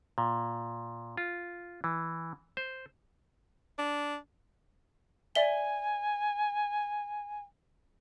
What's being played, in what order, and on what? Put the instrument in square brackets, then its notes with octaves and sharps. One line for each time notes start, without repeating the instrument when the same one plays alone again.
[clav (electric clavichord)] A#2
F4
E3
C5
[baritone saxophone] D4
[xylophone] D5 E5 G7 [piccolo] G#5